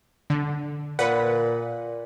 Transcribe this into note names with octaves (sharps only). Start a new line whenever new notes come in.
D3
A#2 B4 F#5